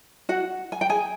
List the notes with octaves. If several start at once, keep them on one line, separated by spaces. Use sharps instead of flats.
F#4 F#5
G#5
G5
G#4 G#5